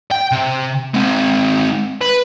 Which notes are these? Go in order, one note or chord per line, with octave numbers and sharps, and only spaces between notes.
G5
C3
G#3 C4
B4